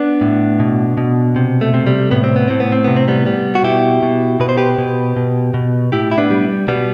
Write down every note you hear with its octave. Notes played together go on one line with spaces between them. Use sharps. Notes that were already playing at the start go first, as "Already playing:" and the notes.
Already playing: B3 D4
A2
B2
B2
C3
A3
C3
G3
A2 B3
C4
B3
A2 C4
B3
C4
C3 B3
C4
G3 B3
G3
F#4
B2 E4 G4
B2
B2 B4
C5
G4 B4
B2
B2
B2
A2 E4 G4
E4
B3 D4
G3
B2 G3 B3